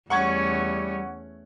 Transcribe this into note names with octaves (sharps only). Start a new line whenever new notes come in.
E2 G3 A3 C#4 F#5 C#6 G#6